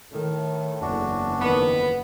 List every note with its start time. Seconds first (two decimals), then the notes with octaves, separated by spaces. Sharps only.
0.12 A2 D#3 A4
0.81 F#1 E2 D4 F#4
1.40 F2 D3 D#3 B3